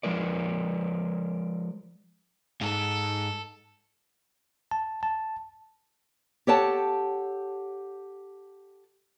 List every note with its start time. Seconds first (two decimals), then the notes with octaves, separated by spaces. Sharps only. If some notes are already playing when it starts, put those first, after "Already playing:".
0.03 F3 G#3 A#4 D5
2.61 G#2 A4
4.71 A5
5.03 A5
6.47 G4 A4 C#5 F#5 G5 A5